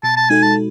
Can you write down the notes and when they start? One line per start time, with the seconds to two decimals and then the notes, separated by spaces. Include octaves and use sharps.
0.03 B2 A5
0.17 A5
0.30 G#3 D#4 F#4 A4 G#5
0.43 A5